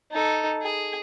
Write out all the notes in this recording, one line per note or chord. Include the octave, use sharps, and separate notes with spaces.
D#4 A4
G#4